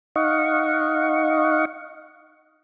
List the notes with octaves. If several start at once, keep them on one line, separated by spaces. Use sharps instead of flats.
D#4 D#5 F5 F#5 C#6